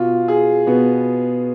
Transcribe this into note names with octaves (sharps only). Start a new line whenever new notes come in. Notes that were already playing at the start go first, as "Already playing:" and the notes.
Already playing: B2 F4
G#4
B2 B3